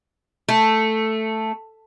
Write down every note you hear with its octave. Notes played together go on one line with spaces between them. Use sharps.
A3